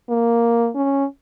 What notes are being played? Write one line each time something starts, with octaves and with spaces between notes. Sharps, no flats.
A#3
C#4